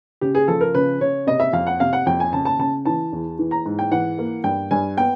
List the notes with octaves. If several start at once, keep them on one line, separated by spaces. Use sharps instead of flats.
C#3 G4
G#4
F3 A4
A#4
C#3 B4
C#3 C#5
C3 D#5
E5
F2 F5
F#5
C3 F5
F#5
F2 G5
G#5
C#3 A5
A5
C#3 A5
E3 A5
E2
E3
A#5
G#2
G5
E3 F#5
A#3
G2 G5
G2 G#5
B3 G5